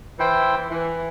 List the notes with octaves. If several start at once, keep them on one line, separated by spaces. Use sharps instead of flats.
E3 E4 C5 G5
E3